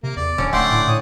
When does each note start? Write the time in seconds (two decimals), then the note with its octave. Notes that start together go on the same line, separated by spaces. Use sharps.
0.03 C3 A#3
0.17 E2 D5
0.38 D1 D3 C#4
0.53 D1 A3 D5 F#5 G5 C6
0.71 A2
0.87 A2 C#5 D#6